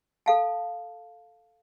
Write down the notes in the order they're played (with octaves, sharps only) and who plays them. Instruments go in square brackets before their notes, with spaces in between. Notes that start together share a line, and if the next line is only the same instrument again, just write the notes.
[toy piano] A4 F5 A5